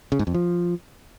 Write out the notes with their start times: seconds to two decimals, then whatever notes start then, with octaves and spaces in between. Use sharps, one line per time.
0.12 C#3
0.19 G#2
0.27 F2
0.34 F3